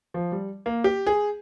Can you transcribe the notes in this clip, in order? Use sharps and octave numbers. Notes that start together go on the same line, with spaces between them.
F3
G3
A#3
G4
G#4